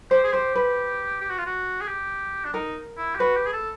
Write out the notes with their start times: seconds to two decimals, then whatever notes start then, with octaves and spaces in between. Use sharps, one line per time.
0.11 G4 C5
0.24 G#4
0.33 G4 C5
0.55 B4
1.21 G4
1.30 F#4
1.38 F4
1.46 F#4
1.81 G#4
1.88 G4
2.44 D4
2.54 D#4 A#4
2.98 E4
3.15 G4
3.20 F#4 B4
3.37 G4
3.47 G#4
3.53 A4